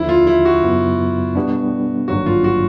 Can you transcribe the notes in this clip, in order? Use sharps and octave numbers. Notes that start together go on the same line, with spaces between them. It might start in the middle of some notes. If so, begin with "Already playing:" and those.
Already playing: D#2 D3 F3 E4
F4
E4
F#4
F#2 C#3 F#3 B3 E4
B2 G3 B3 D4
G#1 G2 D3 F#3 A#3 F#4
F4
F#4